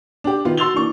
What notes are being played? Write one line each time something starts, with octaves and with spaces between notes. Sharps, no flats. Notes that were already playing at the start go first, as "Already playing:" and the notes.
D4 G4
D#3 B3 F4
F#4 C6 E6 A6 F7 G7
E3 A#3 D4 C#6